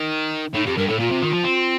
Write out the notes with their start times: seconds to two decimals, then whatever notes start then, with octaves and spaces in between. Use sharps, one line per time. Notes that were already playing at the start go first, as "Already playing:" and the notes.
Already playing: D#3
0.54 A2 D#4
0.66 F2 G4
0.77 G2 A#4
0.88 A2 A4
0.99 A#2 F4
1.10 C3
1.22 D#3
1.32 F3
1.44 C4